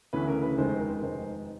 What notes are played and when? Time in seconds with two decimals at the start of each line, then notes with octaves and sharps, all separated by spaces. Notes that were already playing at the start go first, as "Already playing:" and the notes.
0.13 D2 C#3 E3 A3 C#4 B4
0.28 A#4
0.42 B4
0.57 F1 D#2 D#3 G#3 C5
0.69 C5
0.80 A#4
0.91 A#4
1.02 F1 D#2 D#3 G#3 C5